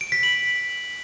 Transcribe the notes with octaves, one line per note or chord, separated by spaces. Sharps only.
D7
B6
F#7